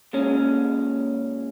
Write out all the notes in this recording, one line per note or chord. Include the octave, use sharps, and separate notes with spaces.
A#2 G#3 C#4